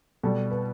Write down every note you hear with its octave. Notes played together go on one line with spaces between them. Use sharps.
B2 G3 A4
B4